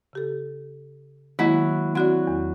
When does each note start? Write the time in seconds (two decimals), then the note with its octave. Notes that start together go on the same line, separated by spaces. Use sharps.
0.13 C#3 G4 A4
1.39 D#3 F#3 G#3 A#3 E4
1.95 F#3 C4 F#4 D5
2.27 E2